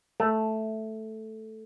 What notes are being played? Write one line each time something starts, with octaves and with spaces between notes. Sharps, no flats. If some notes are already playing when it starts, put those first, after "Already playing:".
A3